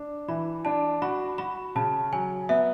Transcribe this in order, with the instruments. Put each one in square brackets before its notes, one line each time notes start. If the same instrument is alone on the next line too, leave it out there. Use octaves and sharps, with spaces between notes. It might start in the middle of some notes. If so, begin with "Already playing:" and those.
Already playing: [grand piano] D4
[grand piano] E3 [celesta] B5
[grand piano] D4 [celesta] A5
[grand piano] F#4 [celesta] B5
[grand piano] F#4 [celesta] B5
[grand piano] C#3 [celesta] A5
[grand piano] F#3 [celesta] G#5
[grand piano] B3 [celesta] E5